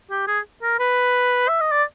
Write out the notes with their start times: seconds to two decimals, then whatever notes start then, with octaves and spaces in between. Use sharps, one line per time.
0.10 G4
0.27 G#4
0.63 A#4
0.79 B4
1.48 E5
1.60 D#5
1.72 D5